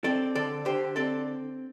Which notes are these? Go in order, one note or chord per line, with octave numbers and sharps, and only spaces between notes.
C4 A4 D5
D3 A4 D5
D3 G4 C5
C4 A4 D5